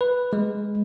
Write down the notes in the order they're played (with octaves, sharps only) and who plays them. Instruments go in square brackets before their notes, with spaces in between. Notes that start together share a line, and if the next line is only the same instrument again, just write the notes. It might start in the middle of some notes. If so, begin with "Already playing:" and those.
[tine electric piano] B4
G#3